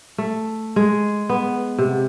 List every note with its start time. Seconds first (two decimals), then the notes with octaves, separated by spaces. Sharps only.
0.18 A3
0.76 G#3
1.29 B3
1.78 C3